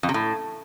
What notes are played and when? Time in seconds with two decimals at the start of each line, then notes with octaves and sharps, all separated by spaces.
0.03 F2
0.09 C3
0.14 A2